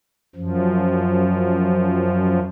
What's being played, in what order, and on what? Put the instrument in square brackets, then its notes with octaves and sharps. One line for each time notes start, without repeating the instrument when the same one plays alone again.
[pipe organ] F#2 F3